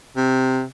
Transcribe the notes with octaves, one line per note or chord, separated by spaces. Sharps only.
C3